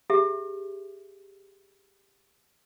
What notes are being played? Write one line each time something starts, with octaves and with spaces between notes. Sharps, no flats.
G4 G#4 E5